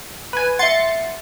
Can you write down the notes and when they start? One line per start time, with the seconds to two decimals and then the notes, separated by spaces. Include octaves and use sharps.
0.33 B4 G#5
0.59 E5 F#5 C6 A6 C#7